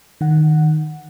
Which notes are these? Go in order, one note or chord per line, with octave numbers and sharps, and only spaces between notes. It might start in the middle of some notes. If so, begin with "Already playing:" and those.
D#3 F#5